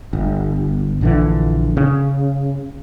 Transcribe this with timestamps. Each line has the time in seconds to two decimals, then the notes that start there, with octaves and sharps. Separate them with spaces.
0.13 G1
1.01 A#1 D3 E3
1.77 C#3